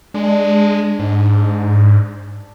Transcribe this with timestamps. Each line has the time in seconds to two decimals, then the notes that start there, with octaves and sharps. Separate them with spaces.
0.14 G#3 D4
0.99 G#2